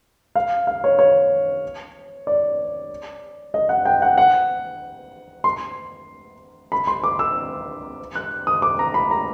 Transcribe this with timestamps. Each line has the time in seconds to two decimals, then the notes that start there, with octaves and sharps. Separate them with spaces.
0.36 F5
0.67 F5
0.84 C#5
0.99 C#5
2.27 D5
3.54 D#5
3.69 F#5
3.85 G5
4.02 F#5
4.18 F#5
5.44 C6
6.72 B5
6.87 C6
7.04 D6
7.19 E6
8.16 F#6
8.47 D#6
8.62 D6
8.79 A#5
8.94 B5
9.11 A#5